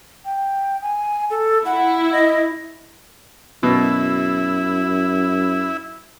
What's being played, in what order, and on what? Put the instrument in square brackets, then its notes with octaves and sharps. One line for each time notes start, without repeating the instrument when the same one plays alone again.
[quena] G5
G#5
A4
[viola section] E4 [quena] F#5
[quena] D#5
[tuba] F#2 [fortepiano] B2 [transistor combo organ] E4